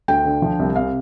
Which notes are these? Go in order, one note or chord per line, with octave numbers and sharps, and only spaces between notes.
D2 G5
D3
F3
C2
C3 F5